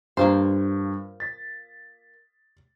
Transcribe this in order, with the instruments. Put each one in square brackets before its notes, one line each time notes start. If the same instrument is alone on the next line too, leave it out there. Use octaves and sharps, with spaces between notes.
[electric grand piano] G2 [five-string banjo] A#3 F4 C5
[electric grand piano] A6 B6